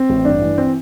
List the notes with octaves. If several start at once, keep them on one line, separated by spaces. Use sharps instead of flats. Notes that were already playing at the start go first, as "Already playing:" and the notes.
Already playing: C4
A1
G2 D4
E3
C4